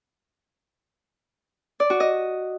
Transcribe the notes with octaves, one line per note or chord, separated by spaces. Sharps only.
D5
F#4
D#5